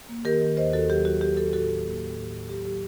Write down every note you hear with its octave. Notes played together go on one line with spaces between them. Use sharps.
A#3
D#3 G4 A#4
D#3
D#2 C5 D#5
D#2 F#4 A4
F#3 G4
F#3 F#4
F#3 G4
F#3 F#4 A4
A2 F#4 A4
F#3 F#4
A#3 F#4
A2
A2 G4
A2
F#3 G4
F#3 G4